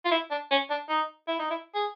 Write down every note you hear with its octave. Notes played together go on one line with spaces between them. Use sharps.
F4
E4
D4
C#4
D4
D#4
E4
D#4
E4
G#4